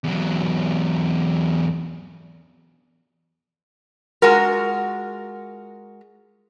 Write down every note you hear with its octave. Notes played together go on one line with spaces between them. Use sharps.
E2 F#3
G#3 F4 F#4 A#4